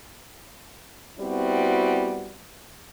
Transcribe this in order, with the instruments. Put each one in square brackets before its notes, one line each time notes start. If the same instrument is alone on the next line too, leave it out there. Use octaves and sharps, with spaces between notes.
[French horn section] G3 B3 C4 E4 F#4